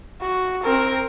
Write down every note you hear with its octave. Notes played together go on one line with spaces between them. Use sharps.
F#4
C4 A#4